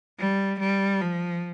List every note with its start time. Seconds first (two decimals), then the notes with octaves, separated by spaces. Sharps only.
0.19 G3
0.60 G3
1.01 F3